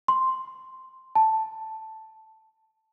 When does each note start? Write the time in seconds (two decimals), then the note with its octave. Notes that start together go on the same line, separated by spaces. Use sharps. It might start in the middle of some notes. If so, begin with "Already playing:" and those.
0.08 C6
1.15 A5